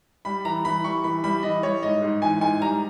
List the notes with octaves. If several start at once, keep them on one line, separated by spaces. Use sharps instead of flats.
G3 B5
E3 A#5
E3 B5
G3 C#6
E3 B5
G3 B5
E3 D#5
G3 C#5
G#2 D#5
G#2
E3 G#5
G#2 G#5
G3 A#5